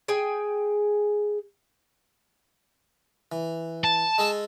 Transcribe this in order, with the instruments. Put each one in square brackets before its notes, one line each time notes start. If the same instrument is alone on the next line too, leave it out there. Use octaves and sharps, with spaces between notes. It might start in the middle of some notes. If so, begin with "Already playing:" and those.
[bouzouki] G#4 G5 G#5
[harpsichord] E3
[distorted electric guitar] A5
[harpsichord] G#3 G#4 A4